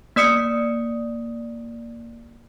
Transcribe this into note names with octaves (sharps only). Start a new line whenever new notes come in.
A#3 D5 D#6 C#7